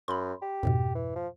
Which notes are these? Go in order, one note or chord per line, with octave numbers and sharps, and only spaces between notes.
F#2 B5 C6
G4
F2 G#2 B2
E3
F3